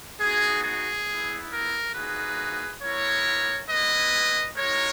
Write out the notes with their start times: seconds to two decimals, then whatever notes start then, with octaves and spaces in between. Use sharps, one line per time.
0.20 B3 D#4 F#4 G#4
0.63 G#4
1.08 B3 E4
1.52 A#4
1.94 A#3 D#4 F#4 G#4 B4
2.82 B3 E4 A#4 C#5
3.69 G#3 B3 E4 B4 D#5
4.57 G#3 D#4 F#4 A#4 C#5